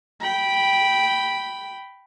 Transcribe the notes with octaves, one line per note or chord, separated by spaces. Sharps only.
G5 B5